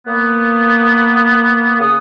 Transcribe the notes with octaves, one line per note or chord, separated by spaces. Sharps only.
A#3 B3
C#3 F#5 D#6